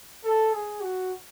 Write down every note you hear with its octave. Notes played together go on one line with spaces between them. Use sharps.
A4
G#4
F#4